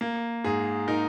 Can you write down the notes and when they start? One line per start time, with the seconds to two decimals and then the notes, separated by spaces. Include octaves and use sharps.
0.01 A#3
0.44 G#2 G#4
0.88 D#4 A#4